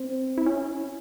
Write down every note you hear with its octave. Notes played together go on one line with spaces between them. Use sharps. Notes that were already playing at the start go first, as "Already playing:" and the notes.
Already playing: C4
E4
C#4